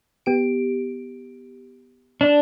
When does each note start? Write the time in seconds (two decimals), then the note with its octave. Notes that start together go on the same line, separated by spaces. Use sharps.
0.26 B3 G4 D7
2.21 D4